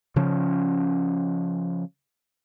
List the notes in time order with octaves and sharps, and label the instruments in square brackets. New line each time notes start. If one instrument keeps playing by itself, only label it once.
[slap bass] C#3 F3 C#4